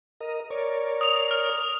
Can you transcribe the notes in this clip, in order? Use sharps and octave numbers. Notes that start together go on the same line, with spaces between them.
A#4 D#5
A#4 C#5 D5
D#6 F7
F6